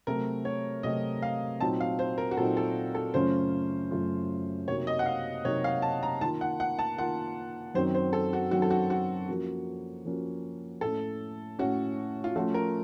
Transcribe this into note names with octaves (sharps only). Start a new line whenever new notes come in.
C3 F#3 A3 C4 F#4 A#4
C#5
C3 F#3 A3 C4 F#4 D#5
F5
A#2 F#3 C4 D#4 A5
F5
C5
A#4
F#4
A#2 F#3 C4 D#4 A4
A4
A4
F#2 C#3 A3 C#4 F4 C5
F#2 C#3 A3 C#4 F4
C3 F#3 A#3 D#4 F#4 C#5
D#5
F#5
F5
C3 F#3 A#3 D#4 F#4 C#5
F5
A5
A#5
D#3 A#3 F4 A5
F#5
F#5
A5
D#3 A#3 F4 F#5
F#2 D#3 F#3 C4 C5
C5
A4
F#4
F#2 D#3 F#3 C4 F#4
A4
F#4
F#4
F3 A#3 C#4 F#4
F3 A#3 C#4 F#4
A2 A3 C#4 A4
A2 A3 C#4 F#4
F4
F3 A3 C#4 F4 F#4
A#4